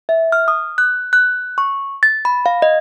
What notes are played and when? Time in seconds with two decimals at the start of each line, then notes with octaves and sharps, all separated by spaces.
0.09 E5
0.32 F6
0.48 D#6
0.78 F#6
1.13 F#6
1.58 C#6
2.03 A6
2.25 B5
2.46 F5
2.62 D#5